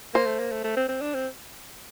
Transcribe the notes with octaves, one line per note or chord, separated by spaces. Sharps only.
A#3 C5
A3
A#3
A3
A3
C4
C4
D4
C4